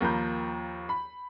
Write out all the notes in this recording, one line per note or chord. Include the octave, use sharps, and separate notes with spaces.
D#2 F3 A#3 A#5 B5 G6
B5